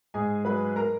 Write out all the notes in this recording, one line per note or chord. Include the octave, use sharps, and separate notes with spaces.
G#2 G#4 G#5
F#3 B4 B5
A#4 A#5